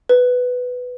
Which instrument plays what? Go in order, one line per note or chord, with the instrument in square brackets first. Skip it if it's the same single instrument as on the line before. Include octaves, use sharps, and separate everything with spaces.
[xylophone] B4